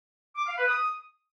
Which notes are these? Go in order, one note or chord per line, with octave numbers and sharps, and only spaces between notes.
D6
F5
B4
D#6